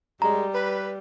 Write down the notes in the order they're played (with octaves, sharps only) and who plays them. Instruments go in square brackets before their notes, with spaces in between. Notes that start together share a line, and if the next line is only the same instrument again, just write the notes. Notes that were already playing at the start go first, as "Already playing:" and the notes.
[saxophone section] F#2 G#3 [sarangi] G3 [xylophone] A#5
[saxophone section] B4